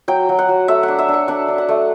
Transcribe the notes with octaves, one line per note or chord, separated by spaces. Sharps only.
F#3 G5
F#3
F#5
F#3
A3 E5
D4 F#5
E5
D4 F#5
D4 F#5
D4
F#5
A3